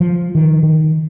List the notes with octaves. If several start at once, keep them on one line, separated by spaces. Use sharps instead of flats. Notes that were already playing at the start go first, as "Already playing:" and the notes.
F3
D#3
D#3